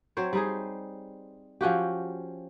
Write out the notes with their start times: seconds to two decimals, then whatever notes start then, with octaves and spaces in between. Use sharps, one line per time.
0.17 F#3 C4 C5 C#5
0.33 G3 D#4 G#4
1.61 F3 C#4 F#4 G4